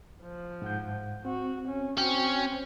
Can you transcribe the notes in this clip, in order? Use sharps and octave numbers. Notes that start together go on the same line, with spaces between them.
F3
G#2 F#5 G6
C4 F#4
C#4
C4 C#4 F#4 G5